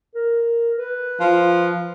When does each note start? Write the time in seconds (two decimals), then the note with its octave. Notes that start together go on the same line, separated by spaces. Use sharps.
0.15 A#4
0.78 B4
1.20 F3